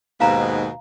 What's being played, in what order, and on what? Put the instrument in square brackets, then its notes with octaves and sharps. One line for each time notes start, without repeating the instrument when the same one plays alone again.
[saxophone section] D#2 B2 [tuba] G#2 [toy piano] F5 A#5